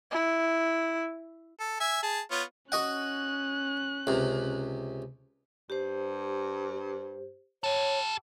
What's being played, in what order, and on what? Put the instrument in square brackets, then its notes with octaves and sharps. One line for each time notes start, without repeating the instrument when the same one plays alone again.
[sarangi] E4
[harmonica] A4
E5 G#5
G#4 A5
B3 F4 C#5
[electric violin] C#4 F#6 [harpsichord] F#4 D#5 F#5
[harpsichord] C#2 C3
[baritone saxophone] G2 [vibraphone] G4 C5
[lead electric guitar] G4 A4 [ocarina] C#5